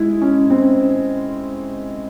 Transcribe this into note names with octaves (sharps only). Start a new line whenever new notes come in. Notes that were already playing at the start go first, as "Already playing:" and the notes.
Already playing: G#3 E4
C#4
C4